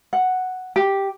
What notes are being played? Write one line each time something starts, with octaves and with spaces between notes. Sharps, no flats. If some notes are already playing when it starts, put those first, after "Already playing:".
F#5
G4